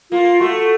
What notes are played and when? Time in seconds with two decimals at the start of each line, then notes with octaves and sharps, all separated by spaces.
0.11 A#3 F4
0.40 A3 F#4